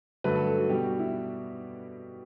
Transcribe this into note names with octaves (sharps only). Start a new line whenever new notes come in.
G2 D3 F#3 A3 B4
A4
A4
F#4
B2 G3 G4
F#4
E4